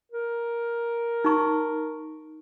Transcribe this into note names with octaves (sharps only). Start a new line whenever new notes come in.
A#4
D#4 C#6